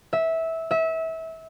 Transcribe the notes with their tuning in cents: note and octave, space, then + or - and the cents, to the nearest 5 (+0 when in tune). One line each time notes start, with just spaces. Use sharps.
E5 -15
E5 -25